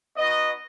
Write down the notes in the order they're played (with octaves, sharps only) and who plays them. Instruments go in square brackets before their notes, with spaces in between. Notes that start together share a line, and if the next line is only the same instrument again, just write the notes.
[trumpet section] B3 D#4 F#4 D#5